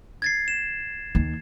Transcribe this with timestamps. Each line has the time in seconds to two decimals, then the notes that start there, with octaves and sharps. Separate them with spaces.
0.22 G#6 A6 C7
0.48 E7
1.15 D#2